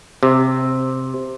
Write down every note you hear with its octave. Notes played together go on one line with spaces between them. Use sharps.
C3